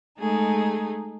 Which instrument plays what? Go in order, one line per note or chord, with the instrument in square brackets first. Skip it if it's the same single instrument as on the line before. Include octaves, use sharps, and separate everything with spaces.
[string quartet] G#3 A3 D#4 G#4